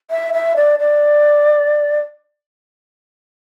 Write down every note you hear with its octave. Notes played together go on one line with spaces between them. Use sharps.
E5
E5
D5
D5